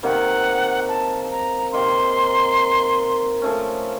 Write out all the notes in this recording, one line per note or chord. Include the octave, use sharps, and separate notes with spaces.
C3 D#3 A#3 F#5
A5
A#5
C3 D#3 A#3 D#4 C6
F3 A3 C#4